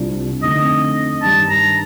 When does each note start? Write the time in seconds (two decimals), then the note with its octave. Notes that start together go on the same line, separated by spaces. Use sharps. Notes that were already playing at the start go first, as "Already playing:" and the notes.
Already playing: C2 C3 G3 D4 F4
0.43 F2 D3 A3 C4 D#4 D#5
1.23 G2 D#3 G3 D4 A5
1.50 A#5